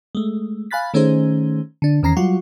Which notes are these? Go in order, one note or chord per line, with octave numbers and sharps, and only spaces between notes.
G#3 A3
F5 G#5 B5 F#6 A6 B6
D#3 A3 C#4 D#4 G#4 C5
D3 D4
E2 D#3 C#4 A#5 A#6 C7
F#3 G3 F4 F#4 F#5